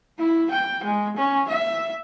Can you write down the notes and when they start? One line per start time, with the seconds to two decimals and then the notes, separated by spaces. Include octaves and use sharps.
0.18 E4
0.51 G5
0.84 G#3
1.17 C#4
1.49 E5